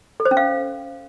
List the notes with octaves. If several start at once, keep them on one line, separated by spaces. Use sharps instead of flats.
A4
C5
C#4
F5